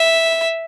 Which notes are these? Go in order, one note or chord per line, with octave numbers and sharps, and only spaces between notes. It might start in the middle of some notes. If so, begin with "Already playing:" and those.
Already playing: E5